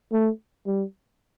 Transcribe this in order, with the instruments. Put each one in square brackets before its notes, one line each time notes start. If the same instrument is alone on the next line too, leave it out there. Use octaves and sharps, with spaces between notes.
[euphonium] A3
G3